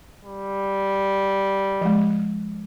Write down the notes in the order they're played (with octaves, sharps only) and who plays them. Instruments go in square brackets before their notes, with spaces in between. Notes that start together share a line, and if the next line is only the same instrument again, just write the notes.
[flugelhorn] G3
[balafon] F3 G#3